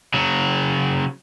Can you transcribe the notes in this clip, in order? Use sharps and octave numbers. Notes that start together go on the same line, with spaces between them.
C#3 F#3